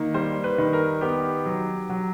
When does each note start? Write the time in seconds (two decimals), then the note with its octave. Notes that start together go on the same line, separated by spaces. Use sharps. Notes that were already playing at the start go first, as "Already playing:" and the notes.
Already playing: D#3 A#3
0.14 G3 C5
0.44 B4
0.58 D#3
0.73 A#4
1.01 B3 G4
1.46 F#3
1.90 F#3